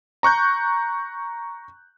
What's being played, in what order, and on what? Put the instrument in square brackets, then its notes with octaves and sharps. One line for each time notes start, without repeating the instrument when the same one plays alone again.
[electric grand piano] A#5 C#6 F#6 G6